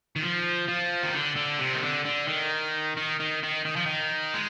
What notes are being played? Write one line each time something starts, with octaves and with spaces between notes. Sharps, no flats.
D#3
F3
F3
D#3
D3
D3
C3
D#3
D3
D3
D#3
D#3
D#3
D#3
D#3
F3
D#3
G#3